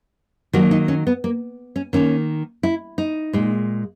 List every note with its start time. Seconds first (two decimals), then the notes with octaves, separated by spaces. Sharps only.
0.53 D#3 F#3 A#3 F#4
0.71 D#4
0.88 C#4
1.07 B3
1.24 A#3
1.76 C#4
1.93 D#3 A#3 C#4
2.63 E4
2.98 D#4
3.33 A#2 G#3